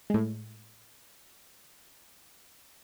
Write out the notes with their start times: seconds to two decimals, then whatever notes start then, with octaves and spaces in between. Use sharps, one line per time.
0.10 A2 G#3